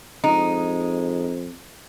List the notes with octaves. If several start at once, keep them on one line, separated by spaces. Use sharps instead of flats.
F2 G#3 D#4